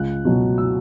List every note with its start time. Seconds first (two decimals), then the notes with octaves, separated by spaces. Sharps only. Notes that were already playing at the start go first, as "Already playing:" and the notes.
Already playing: C#2 F#6
0.25 B2 F#3
0.58 E6